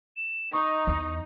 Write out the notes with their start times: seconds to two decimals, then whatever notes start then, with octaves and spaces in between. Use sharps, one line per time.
0.17 E7
0.53 D#4 C#6 D#6
0.87 E2